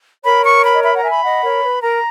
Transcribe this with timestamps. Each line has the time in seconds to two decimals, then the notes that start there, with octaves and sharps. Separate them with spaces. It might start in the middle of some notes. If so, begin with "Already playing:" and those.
0.25 A#4 C#5 B5
0.45 C#6
0.65 B5
0.75 D#5
0.84 E5 B5
0.94 F#5 A#5
1.03 E5 G#5
1.10 B5
1.23 D#5 F#5
1.43 A#4 C#5
1.63 B4
1.82 A#4 A#5